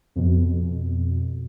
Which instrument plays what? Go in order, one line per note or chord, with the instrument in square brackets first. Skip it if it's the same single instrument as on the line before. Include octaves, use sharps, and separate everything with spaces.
[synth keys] F2 B2